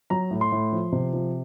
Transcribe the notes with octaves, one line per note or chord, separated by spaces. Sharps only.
F#3 A#5
A2
C6
A2
F3
C3
F3